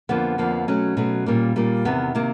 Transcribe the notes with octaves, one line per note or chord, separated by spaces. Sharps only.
F2 D3 F3 A#3 B3
F2 D3 F3 A#3
B2 F#3 A3 C#4
B2 F#3 A3
A#2 G3 A#3
A#2 G3 A#3
E2 C3 D#3 B3
C3 D#3 A#3